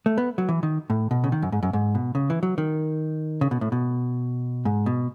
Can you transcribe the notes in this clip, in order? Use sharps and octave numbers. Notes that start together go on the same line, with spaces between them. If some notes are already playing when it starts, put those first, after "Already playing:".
A3
B3
F#3
E3
D#3
A2
B2
C#3
D#3
F#2
G#2
F#2
G#2
B2
C#3
E3
F#3
D#3
C#3
B2
A2
B2
G#2
B2